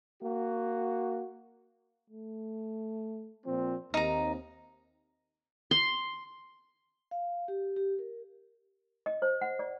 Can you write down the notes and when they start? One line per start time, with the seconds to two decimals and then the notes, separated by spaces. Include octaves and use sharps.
0.21 A#3 F#4
2.10 A3
3.46 A#2 F3 C4
3.94 D#2 C4 D#4 A#5
5.71 C6
7.11 F5
7.48 G4
7.76 G4
7.99 A#4
9.06 D#5
9.22 C5
9.41 F#5
9.59 D5